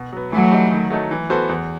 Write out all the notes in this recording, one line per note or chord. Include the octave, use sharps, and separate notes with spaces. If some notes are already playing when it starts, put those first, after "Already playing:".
Already playing: B2
F#3 B3
E3 F#3 A3
G3 D#4
D#3
F#3 A3 D#4 A4
E3
B3 F#4 A4 C5
E2